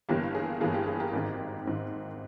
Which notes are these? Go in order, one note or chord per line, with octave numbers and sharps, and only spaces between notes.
G1 G2 E3 A#3 G4
G#4
G1 G2 E3 A#3 G#4
G4
G#4
G4 A#4
G#1 G#2 D#3
G#1 G#2 D#3